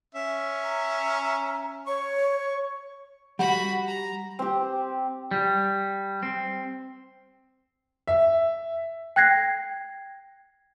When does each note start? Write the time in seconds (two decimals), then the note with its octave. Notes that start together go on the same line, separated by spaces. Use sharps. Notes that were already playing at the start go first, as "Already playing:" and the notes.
0.15 C#4 E5
0.64 A#5
1.87 C#5 C#6
3.39 G3 F#4 F#5 B5
3.87 A#5
4.39 C4 G4
5.31 G3
6.23 C4
8.07 E5
9.16 G5 F#6 G#6 A#6 C7